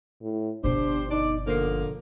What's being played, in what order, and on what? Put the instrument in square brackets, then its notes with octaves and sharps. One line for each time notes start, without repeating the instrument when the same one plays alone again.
[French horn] A2
[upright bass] G1 B2 [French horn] D4 [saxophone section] G4 C5
[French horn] D#4 [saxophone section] D5
[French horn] D3 [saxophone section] F3 A#3